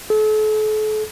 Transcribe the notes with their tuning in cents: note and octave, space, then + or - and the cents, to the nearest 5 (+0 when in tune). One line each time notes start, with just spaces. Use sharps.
A4 -40